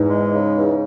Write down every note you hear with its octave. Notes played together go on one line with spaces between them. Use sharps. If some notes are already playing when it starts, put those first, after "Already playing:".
Already playing: E2 G#2
G#3
C#3
E2